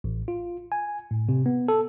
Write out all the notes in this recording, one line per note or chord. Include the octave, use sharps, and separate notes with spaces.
A1
F4
G#5
A2
C3
B3
A4